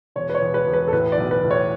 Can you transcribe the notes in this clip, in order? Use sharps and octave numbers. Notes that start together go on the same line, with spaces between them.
E1 C#5
B4
C#5
E1
B4
E1
B4
A4
A2 B4
D5
B1
B4
A2
C#5